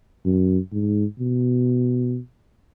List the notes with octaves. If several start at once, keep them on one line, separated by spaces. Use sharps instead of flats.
F#2
G#2
B2